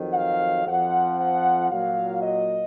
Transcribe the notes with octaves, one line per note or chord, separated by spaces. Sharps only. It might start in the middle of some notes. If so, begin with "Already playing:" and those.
Already playing: F2 D#3 F#3
F5
F2 F3 F#5
F#5
A#2 F#3 F5
D#5